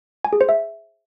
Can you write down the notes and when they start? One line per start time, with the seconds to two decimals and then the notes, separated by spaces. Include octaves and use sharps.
0.25 G#5
0.33 G#4
0.41 C5
0.49 E5